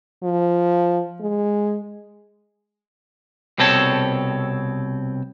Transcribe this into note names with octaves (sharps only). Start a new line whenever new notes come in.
F3
G#3
C2 B2 C4 A4 C#5 A5